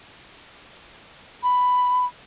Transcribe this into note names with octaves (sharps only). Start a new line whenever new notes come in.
B5